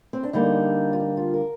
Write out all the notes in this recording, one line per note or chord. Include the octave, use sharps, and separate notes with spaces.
C4
D4
D3 G3 A#3 D#4
F4
D#4
F4
A#4